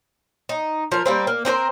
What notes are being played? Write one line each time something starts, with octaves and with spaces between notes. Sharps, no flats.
D#4
F3 A#4
G3 A#3 C4
A#3
C4 D4 A#4 C5